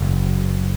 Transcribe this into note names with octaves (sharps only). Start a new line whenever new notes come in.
F#1